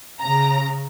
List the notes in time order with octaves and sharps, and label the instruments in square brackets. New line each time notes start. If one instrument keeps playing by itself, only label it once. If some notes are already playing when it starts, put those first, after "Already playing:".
[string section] C#3 [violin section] A#5